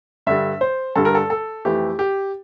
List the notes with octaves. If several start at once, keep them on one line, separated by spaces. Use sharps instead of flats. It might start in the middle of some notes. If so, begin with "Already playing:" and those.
G2 D3 G3 E5
C5
G2 D3 G3 A4
A#4
A4
A4
F2 E3 A3 G4
G4